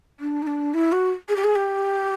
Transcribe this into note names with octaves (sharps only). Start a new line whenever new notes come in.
D4
D#4
D4
E4
F#4
G#4
G4
G#4
G4